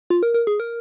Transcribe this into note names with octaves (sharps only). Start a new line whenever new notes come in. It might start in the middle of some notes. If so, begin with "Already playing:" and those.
F4
A#4
A#4
G#4
A#4